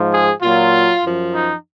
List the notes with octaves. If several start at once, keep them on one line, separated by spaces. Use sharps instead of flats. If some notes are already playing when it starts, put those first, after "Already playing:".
Already playing: G#2 F3
G#4
A#2 F#3 F4
F#2 F3
D#4